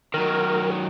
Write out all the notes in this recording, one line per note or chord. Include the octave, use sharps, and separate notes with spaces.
D#3 F#3 A#4